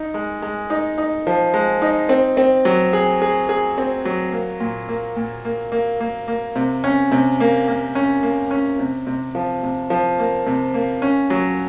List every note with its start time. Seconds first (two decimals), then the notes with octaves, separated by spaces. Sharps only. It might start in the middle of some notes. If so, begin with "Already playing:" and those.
Already playing: D#4
0.14 G#3
0.42 G#3
0.70 D#4
0.98 D#4
1.27 F3
1.54 G#3
1.82 D#4
2.09 C4
2.37 C4
2.65 F#3
2.93 G#4
3.22 G#4
3.49 G#4
3.78 C4
4.05 F#3
4.32 A#3
4.60 A#2
4.89 A#3
5.16 A#2
5.45 A#3
5.72 A#3
6.00 A#3
6.28 A#3
6.56 C3
6.84 C#4
7.12 C3
7.40 A#3
7.68 A#3
7.95 C#4
8.23 A#3
8.51 C#4
8.79 C3
9.07 C3
9.35 F3
9.63 C3
9.90 F3
10.19 A#3
10.46 C3
10.74 A#3
11.02 C#4
11.30 F#3